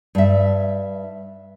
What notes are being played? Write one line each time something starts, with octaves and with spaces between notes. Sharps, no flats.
G2 E5